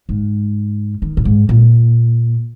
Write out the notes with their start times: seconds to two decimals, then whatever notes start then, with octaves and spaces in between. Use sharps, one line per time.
0.09 G#2
1.02 D#3
1.17 A#2
1.25 G#2
1.49 A#2